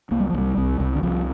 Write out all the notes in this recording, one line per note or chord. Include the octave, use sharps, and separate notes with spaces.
C2 A#3
G3
F3
C2 G3
C2
C2
D3
C2 F3